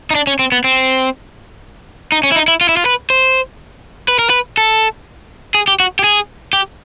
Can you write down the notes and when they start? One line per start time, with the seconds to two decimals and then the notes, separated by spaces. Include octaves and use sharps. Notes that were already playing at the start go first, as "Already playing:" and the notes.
0.10 D#4
0.15 D4
0.27 C#4
0.39 C4
0.52 B3
0.64 C4
2.12 D#4
2.24 C#4
2.32 E4
2.36 D#4
2.48 E4
2.61 F4
2.69 E4
2.77 F4
2.86 B4
3.10 C5
4.08 B4
4.19 A#4
4.30 B4
4.58 A4
5.54 G#4
5.68 G4
5.80 F#4
5.99 G4
6.04 G#4
6.53 G4